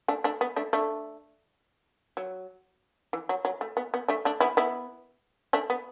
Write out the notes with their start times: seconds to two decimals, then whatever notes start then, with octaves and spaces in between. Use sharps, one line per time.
0.08 A3 D4
0.24 A3 D4
0.41 B3
0.56 A3 D4
0.73 A3 D4
2.17 F#3
3.13 E3
3.29 F#3
3.45 F#3
3.61 A3
3.77 B3
3.94 B3
4.08 A3 D4
4.25 A3 D4
4.40 B3 E4
4.57 B3 E4
5.53 A3 D4
5.70 B3